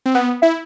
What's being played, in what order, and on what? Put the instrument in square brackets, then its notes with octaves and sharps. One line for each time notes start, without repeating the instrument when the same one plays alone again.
[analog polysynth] C4
[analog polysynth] B3 [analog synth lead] F#5
[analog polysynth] E4 [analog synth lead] E5